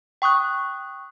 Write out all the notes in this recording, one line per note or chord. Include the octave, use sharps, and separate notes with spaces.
G5 C#6 D#6 F#6